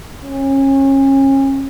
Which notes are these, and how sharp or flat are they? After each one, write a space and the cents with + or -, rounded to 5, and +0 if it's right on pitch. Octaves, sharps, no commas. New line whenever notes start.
C#4 -30